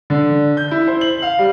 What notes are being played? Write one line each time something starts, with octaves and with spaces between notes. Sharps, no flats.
D3
G6
E4
C5
F#7
F5
G3